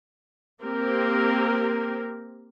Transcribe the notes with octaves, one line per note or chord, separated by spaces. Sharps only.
A#3 C4 G4 A#4